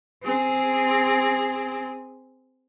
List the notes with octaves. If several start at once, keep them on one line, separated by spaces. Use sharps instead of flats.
C4 G#4